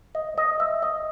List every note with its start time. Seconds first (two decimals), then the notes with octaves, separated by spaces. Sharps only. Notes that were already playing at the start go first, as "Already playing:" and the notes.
0.15 D#5
0.38 D#5
0.60 E5
0.83 D#5